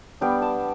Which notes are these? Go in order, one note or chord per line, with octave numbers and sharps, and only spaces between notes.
G3 B3 D4 G5
A5